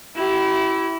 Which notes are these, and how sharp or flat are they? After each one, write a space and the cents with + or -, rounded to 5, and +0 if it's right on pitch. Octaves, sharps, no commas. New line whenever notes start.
E4 +0 G4 -40